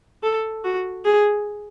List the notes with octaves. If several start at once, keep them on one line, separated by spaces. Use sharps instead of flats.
A4
F#4
G#4